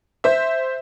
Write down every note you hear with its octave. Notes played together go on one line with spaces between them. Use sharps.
C5 E5